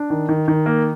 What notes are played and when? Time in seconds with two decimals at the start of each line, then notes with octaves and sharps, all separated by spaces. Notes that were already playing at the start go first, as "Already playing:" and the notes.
Already playing: D4
0.10 D#3
0.29 D#3
0.48 D#3
0.66 A#3